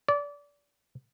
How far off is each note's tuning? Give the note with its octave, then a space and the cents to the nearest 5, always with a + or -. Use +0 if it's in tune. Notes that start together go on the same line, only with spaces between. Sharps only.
D5 -25